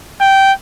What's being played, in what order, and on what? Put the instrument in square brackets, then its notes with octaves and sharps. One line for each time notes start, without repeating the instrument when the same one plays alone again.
[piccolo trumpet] G5